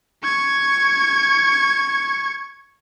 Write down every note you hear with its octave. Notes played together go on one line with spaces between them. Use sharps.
C#6 G#6